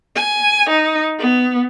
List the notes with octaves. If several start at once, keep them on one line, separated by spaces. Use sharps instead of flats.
G#5
D#4
B3